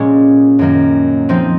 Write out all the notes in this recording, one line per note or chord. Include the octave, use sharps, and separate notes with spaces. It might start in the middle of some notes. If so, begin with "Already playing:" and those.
Already playing: A#2 G#3 C#4
F#2 D#3 A#3
F3 C4 D#4